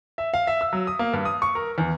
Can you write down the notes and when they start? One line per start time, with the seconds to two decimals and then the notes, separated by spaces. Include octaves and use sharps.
0.18 E5
0.34 F5
0.47 E5
0.61 E6
0.73 F#3
0.87 D#6
0.99 A#3
1.13 G2
1.25 D#6
1.42 C#6
1.55 A#4
1.78 E2